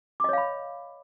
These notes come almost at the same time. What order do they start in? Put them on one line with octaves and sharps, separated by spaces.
D6 D#5 C#5 F5 B5